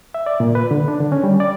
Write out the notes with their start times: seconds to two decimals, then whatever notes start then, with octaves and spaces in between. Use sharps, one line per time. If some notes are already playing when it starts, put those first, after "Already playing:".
0.14 E5
0.26 D5
0.40 A#2
0.55 B4
0.71 D3
0.88 D4
1.00 D3
1.12 C#4
1.24 G3
1.40 D5